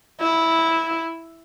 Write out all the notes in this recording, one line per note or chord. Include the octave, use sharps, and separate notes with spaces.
E4